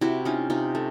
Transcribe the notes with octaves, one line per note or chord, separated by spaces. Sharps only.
C3 E4 F#4
C#4 D#4 F4
C3 D#4 F4
A3